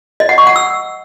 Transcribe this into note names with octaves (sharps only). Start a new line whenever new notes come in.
D#5
F#5
C#6
F#5
E6